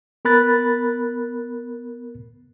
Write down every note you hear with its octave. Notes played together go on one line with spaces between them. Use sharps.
B3 A#4 B5 F#6 A6